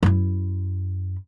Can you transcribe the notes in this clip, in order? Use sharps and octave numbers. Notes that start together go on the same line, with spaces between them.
F#2 E4